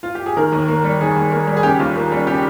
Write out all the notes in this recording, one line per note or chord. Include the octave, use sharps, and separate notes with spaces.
F4
G4
G#4
D#3 A#4
D#2
A#3
G3
D#3 G#4
D#2
A#3
G3
G#4
C#3 G4
D#2 F4
A#3
G3
C#3 G4